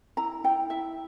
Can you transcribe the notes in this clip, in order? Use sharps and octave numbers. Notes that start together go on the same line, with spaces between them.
E4 A#5
E4 G5
E4 E5